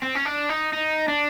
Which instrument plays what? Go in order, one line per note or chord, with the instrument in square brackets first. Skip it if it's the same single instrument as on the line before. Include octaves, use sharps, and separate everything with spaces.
[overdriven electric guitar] C4
C#4
D4
D#4
D#4
D4